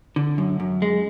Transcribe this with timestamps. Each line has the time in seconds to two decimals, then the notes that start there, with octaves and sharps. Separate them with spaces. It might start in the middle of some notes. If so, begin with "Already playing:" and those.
0.16 D3
0.38 F#2
0.60 F#2
0.82 G#3